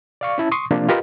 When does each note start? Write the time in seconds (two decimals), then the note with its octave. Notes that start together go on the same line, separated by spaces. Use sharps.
0.21 D5 F5 C#6
0.38 C#4 E4 A5
0.52 C6 C#6 D#6
0.71 C3 F3 A#3 D4 F4
0.89 F4 G4 A#4 B4 D#5